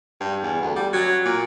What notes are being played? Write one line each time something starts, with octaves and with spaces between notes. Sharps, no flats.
G2
E2
D2
G3
F#3
A#2